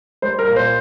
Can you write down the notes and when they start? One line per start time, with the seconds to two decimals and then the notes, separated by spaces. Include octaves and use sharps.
0.22 G3 C5
0.39 A#4
0.47 A#2
0.56 C5